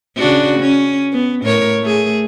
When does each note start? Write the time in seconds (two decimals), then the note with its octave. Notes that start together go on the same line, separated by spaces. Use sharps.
0.17 C#3 D4 F#4
0.59 C#4
1.13 B3
1.43 A2 A#4 C#5
1.82 A3 G#4